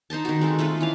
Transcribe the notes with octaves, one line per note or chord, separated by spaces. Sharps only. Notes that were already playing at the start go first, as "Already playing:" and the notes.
D#4 C5 D#5 A5
D#3 F#4
G#3 C4 A4
A3 F4 A4 B4
E3 C#4 F5